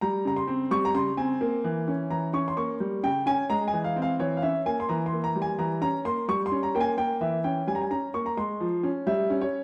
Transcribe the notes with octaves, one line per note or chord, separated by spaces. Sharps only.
G3 A#5
C#3 A#5
C6
C4
G3 C#6
A#5
C#3 C6
C4 G#5
A#3
E3
C#4
E3 A#5
C#4 C#6
C6
A#3 C#6
G3
C#3 G5
C#4 G#5
G#3 A#5
G#5
E3
F5
C4
F5
E3 C#5
F5
C#4 E5
A#3 G#5
C6
E3 A#5
C6
A#3
A#5
G3
G#5
E3 A#5
C#4 A#5
A#3 C6
G3 C#6
C6
C#4
A#5
A#3 G5
G#5
A#3 G5
E3 E5
C#4 G5
G3 G#5
A#5
G#5
C#4 A#5
A#3 C#6
A#5
G#3 C6
F3
C#4
G3 E5
C#4
C#5